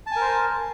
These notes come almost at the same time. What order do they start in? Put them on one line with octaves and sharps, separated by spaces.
A5 G#5 A#4 C5